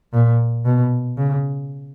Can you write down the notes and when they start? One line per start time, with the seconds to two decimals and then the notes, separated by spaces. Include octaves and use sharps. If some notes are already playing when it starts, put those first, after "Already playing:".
0.14 A#2
0.65 B2
1.17 C#3